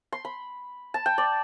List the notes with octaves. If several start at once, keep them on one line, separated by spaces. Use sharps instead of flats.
C6
B5
A5
G5
D5